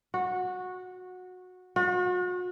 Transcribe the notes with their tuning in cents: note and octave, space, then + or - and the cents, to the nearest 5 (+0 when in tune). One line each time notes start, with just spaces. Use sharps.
F#4 -15
F#4 -40